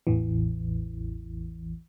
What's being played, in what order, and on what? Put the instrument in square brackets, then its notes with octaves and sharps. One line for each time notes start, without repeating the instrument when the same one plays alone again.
[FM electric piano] A1 E2 E3